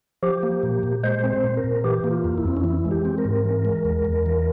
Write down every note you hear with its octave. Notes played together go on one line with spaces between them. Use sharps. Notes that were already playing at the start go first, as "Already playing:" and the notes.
F3 G4
A#3
A#2
A#2
G#3 C5
C4
C5
A#2
A#4
A#2
E3 G4
A#3
F4
F2
E4
F2 C4
C#4
E3 E4
G#3
G4
C4
A#4
G#2
E3
G#3
E2
E2
E3